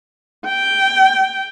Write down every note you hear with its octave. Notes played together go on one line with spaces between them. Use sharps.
G5